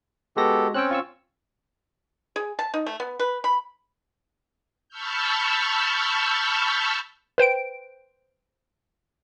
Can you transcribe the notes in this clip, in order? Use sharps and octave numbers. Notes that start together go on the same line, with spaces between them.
G#3 B3 F#4 G4 A4 A#6
C4 C#4 G5 E6 F#6
F4 C#6 E6
G#4
A5
D#4
A3
B3
B4
B5
A5 B5 C#6 E6 F6 G6
B4 C5 G5 D7